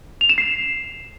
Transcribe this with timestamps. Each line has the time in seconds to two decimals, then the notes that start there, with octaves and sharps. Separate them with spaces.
0.21 F7
0.29 E7
0.38 C7